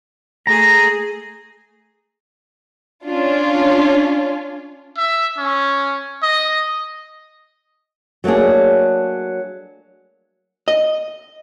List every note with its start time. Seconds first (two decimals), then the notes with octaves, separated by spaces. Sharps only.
0.47 A3 G#4 A#5
3.05 C#4 D4 F4
4.97 E5
5.38 C#4
6.23 D#5
8.24 F#3 A3 A#3 D4 G#4
10.68 D#5